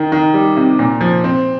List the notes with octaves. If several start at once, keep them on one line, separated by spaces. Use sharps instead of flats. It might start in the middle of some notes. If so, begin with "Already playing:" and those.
Already playing: D#3
D#3
G3
C3
A#2
F3
C4